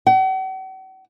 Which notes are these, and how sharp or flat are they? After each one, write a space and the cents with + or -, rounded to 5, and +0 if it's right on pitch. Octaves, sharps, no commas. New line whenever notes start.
F#5 +45